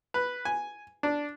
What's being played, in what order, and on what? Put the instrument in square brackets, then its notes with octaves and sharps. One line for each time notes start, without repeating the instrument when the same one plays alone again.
[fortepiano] B4
G#5
D4